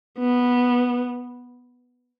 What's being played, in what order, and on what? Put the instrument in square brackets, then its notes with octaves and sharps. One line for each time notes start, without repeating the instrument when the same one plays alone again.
[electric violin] B3